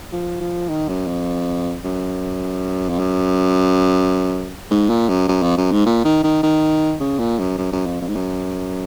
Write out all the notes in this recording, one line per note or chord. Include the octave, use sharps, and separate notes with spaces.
F3
F3
D#3
F#2
F2
F#2
F2
F#2
G#2
A#2
F#2
F#2
F2
F#2
G#2
A#2
D#3
D#3
D#3
C#3
A#2
F#2
F#2
F#2
F2
F2
G#2
F#2